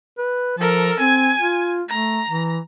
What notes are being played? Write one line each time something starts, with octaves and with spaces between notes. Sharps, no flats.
B4
F3 A4 A#4
C4 G#5
F4
A3 A#5
E3